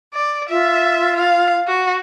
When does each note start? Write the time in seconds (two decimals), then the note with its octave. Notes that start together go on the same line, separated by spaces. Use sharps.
0.14 D5
0.50 F4 E5
1.17 F5
1.68 F#4